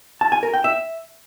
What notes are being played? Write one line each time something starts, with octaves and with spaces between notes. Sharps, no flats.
A5
G#5
A#4
G5
E5